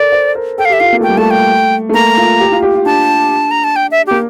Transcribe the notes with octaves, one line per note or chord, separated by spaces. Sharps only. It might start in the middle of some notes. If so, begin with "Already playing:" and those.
Already playing: A4 A#4 D5
C5
A#4
A4 G5
F5
G4 E5
F4 F5
A#3
A3 G5
G3
A3 A5
G5
A3
A#3 A#5
F4
G4
F4
G4
F4
D4 A5
A#5
A5
G5
E5
A#3 G4